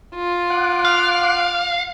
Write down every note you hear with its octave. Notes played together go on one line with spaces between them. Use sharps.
F4
F#5 D6 F#6
F5